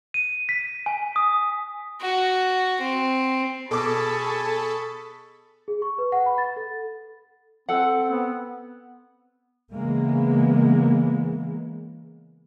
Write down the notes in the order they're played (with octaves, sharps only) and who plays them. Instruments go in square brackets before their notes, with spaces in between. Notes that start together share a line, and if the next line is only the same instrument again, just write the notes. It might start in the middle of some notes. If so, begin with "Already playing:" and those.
[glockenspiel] D#7
B6
G#5
D#6
[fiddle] F#4
C4
[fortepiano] B2 D6 [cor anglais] G#4 [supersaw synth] A4 [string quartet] A5 B5 C#6
[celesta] G#4
C#6
B4
F#5
B5
A6
A4
[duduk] C4 [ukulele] A4 F#5
[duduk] B3
[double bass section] C#3 E3 G#3 A#3 B3